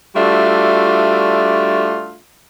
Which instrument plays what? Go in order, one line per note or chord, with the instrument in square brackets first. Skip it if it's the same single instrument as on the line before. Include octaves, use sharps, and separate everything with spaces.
[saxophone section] G3 A3 D4 F4 F#4 E5